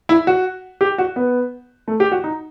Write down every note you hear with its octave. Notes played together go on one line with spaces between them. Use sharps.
E4
F#4
G4
F#4
B3
A3
G4
F#4
D#4